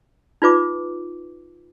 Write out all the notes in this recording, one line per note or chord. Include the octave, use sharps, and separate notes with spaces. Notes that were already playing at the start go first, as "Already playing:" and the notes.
D#4 F4 B4 D6